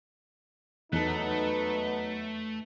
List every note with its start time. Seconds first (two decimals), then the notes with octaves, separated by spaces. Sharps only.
0.92 E2 F#3 A3 B3 D#4 A4 B4 F#6